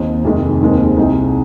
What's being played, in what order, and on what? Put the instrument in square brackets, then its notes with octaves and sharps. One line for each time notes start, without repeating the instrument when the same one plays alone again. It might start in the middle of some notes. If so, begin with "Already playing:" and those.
Already playing: [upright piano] D#2 D#3 C4 D#4
F2 C3 D#3 G#3
D#2 D#3 G#3 C4
C2 C3 G#3 D#4